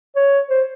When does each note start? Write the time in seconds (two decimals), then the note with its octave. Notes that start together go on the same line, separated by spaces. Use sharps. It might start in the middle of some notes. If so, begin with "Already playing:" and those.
0.16 C#5
0.50 C5